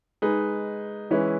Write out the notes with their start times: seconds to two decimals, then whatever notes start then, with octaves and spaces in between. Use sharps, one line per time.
0.22 G#3 D#4 G#4 B4
1.11 E3 G#3 C#4 E4 B4